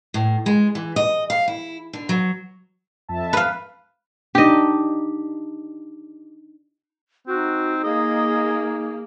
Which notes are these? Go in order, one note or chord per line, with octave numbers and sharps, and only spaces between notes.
A2
G#3
E3
D#5
F5
E4
D3
F#3
F2 E5 A5
B4 F5
D4 D#4 G4 D#5
C4 D#4 F#4
A#3 G#4 D#5